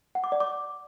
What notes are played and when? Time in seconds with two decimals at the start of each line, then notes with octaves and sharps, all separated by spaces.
0.15 F#5
0.24 D6
0.32 D5
0.40 D6